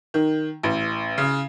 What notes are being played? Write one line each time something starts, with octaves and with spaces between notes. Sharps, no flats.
D#3
A1
C#3